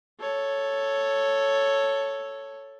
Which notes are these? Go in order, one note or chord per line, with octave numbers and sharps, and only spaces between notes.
A4 C#5